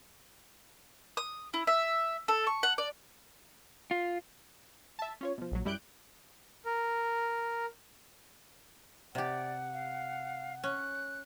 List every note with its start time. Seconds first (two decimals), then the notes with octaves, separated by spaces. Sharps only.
1.17 D#6
1.54 E4
1.67 E5
2.28 A4
2.47 C#6
2.63 F#5
2.78 D5
3.91 F4
4.99 E5 A5
5.21 C#4 F4 C#5
5.38 B2 F3
5.52 A#1 F#3
5.65 F#2 G3 E4 F#6 G6 D7
6.65 A#4
9.15 C3 G4 D5 F#5
9.73 F5
10.63 C#4 F#6